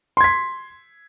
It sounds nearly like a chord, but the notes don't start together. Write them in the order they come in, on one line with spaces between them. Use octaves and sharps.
C6 G#6 B6